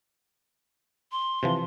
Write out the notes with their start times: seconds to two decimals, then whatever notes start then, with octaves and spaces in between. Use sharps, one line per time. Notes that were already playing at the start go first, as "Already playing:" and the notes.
1.12 C6
1.43 C3 E3 F3